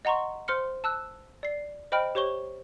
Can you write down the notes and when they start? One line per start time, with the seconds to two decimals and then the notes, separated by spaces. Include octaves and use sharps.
0.05 D#5 F#5 A#5 C6 C#6
0.48 C5 C6 F6 C#7
0.84 A5 E6 F#6
1.43 D5 C7
1.92 C5 D#5 G5 B5 F6 D7
2.15 G4 C5 C#5 C#6 G7